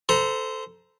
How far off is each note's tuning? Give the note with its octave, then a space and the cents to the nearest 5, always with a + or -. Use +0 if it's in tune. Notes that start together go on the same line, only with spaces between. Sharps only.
A4 +0 C5 -20 A#5 +20